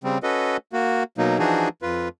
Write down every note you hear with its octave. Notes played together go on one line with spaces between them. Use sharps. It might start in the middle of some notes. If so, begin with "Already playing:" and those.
C#3 G3 C4
C#4 F#4 A4 B4 D#5
A#3 F#4
B2 F#3 A#3 D#4
E3 F3 D4 D#4 F#4 G#4
F2 F4 B4